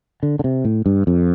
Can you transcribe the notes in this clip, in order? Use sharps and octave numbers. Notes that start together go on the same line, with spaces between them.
D3
D3
C3
A2
G2
F2